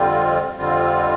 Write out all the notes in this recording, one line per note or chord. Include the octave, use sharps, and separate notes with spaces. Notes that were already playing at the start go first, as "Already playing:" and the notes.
Already playing: F2 D3 G3 C4 F4
F2 D3 G3 C4 F4